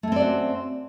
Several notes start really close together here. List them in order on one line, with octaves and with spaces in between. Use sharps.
A3 C#4 C4 D5 F#4